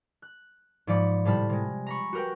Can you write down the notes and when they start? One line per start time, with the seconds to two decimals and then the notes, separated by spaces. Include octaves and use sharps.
0.22 F#6
0.87 G#2 F3 D5 B5 C#7
1.25 A2 C3 G3 A5 B5 F6
1.49 C3 G#3
1.87 A#5 B5 C#6
2.13 F#4 G4 A#4 B4 G5